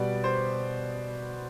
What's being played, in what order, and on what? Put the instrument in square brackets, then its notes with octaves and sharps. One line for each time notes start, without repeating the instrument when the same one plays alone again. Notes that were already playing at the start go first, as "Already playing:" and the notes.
Already playing: [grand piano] B2 G3 B3 D5
C5